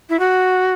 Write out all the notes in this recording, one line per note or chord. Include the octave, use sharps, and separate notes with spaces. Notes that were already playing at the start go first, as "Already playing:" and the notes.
E4
F#4